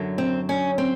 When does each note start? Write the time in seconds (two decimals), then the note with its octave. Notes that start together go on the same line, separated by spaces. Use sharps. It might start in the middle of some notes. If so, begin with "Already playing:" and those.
Already playing: F#2 D3 F#3
0.18 C4
0.49 C#4
0.78 C4